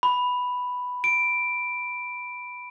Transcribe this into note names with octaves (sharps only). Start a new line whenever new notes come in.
B5
D7